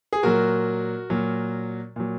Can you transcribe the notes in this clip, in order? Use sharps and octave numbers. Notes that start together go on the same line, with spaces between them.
G#4
A#2 F#3 F#4 A#4
A#2 F#3
A#2 F#3